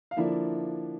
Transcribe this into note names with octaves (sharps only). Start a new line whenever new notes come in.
F5
D3 F3 A#3 D4 E4 E5